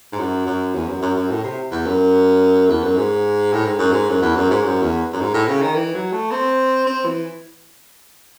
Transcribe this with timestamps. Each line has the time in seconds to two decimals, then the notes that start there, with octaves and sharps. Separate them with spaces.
0.12 G#2
0.19 F#2
0.47 F#2
0.75 E2
0.88 F#2
1.02 F#2
1.16 F#2
1.30 A2
1.44 C3
1.71 E2
1.86 F#2
2.70 E2
2.83 F#2
2.97 G#2
3.53 A2
3.65 G#2
3.79 F#2
3.92 G#2
4.09 F#2
4.22 E2
4.36 F#2
4.51 G#2
4.65 F#2
4.82 E2
5.13 F#2
5.20 G#2
5.34 A2
5.48 C#3
5.62 D#3
5.75 E3
5.94 F#3
6.12 A3
6.32 C4
6.87 C4
7.05 E3